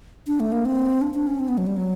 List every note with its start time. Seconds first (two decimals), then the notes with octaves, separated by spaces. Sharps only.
0.27 D4
0.40 A3
0.52 A#3
0.65 C4
1.02 D4
1.14 D4
1.27 C#4
1.39 C4
1.48 B3
1.58 F#3
1.67 G3
1.77 F#3